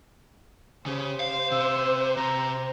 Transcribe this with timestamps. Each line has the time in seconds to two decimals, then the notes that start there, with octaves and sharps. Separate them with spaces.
0.86 C#3 G4 C5
1.20 F5
1.51 C3 E6
2.17 C3 A#5